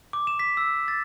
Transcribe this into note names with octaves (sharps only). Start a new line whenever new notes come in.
D6
E7
B6
E6
A6